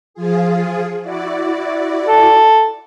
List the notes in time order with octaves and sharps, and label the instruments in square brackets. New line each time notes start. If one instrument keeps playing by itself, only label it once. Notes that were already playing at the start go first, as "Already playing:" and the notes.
[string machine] F3 F4 G#4
E4 F#4 D5
[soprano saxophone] A4